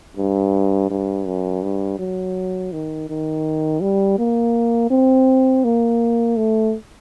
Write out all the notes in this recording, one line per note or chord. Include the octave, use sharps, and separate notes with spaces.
G2
G2
F#2
G2
F#3
D#3
D#3
G3
A#3
C4
A#3
A3